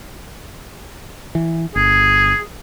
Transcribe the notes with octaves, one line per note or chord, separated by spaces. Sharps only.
E3
G1 G#4